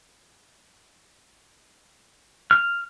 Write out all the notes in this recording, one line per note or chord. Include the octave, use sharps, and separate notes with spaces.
F6